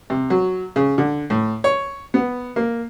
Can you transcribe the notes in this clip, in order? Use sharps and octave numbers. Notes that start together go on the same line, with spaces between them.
C3
F#3
C#3
D3
A2
C#5
B3
A#3